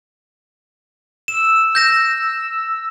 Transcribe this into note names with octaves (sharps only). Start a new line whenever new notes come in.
E6 E7
G6 A#6 E7